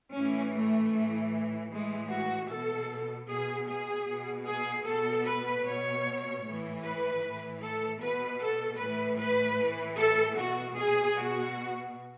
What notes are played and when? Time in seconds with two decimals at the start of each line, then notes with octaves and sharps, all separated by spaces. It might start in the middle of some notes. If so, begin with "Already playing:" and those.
0.15 A2 E3 C#4
0.55 A3
0.94 A2 E3
1.72 A2 E3 G#3
2.12 F#4
2.51 B2 A4
3.30 B2 G#4
3.69 G#4
4.08 B2
4.48 G#4
4.87 B2 A4
5.27 B4
5.66 B2 C#5
6.45 A2 E3
6.83 B4
7.23 A2 E3
7.63 A4
8.02 B2 B4
8.41 A4
8.80 A2 E3 B4
9.19 B4
9.59 A2 E3
9.99 A4
10.37 B2 F#4
10.77 G#4
11.17 B2 F#4